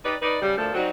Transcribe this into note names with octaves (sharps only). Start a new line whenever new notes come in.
D#4 G4 B4 D5
D#4 B4 D5
C#3 G3
D2 A#2 F3 A3 A4
F#3 G3 C4 D#4 F#4